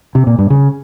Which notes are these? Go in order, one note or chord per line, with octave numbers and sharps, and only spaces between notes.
C3
A#2
G2
C#3